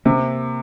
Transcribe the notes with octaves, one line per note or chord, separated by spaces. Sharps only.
C3 A#3